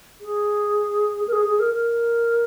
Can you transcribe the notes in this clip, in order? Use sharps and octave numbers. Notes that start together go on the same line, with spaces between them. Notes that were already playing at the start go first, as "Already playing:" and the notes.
G#4
A#4
G#4
G#4
A#4
A#4